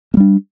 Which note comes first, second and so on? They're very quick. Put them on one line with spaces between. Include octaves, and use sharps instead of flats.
A#3 G3 D4